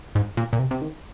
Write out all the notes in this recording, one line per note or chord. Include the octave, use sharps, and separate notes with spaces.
G#2
A#2
A#2
C3
C3
D#3